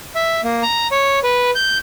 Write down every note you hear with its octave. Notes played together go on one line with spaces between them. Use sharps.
E5
A#3
A#5
C#5
B4
G6